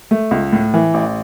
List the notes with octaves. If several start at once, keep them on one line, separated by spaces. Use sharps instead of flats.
A3
C#2
A2
E3
A1